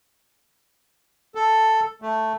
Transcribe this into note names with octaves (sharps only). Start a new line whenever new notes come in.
A4
A3